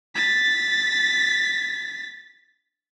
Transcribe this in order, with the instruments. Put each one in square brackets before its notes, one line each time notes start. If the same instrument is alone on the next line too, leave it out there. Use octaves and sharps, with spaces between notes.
[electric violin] A6 B6